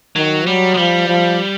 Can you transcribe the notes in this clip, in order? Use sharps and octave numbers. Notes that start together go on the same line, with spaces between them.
D#3 F#3
F#3 G3
G#3
F3 G3
F3